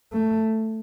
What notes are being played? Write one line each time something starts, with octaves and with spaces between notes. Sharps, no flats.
A3